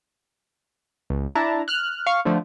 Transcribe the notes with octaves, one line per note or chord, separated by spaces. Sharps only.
C#2
D4 E4 A5 A#5
F6 F#6
F5 C#6
D3 F3 A3